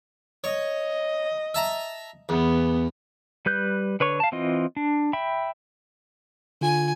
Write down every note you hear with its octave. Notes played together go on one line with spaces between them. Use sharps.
C#5 D#5
E5 A5 A#5
E2 B3
G3 B4 F#6 G6
D3 B4 C#5 C#6
F5 A5
E3 C4 F4 D#5
D4
E5 G5 B5
D3 F4 G#5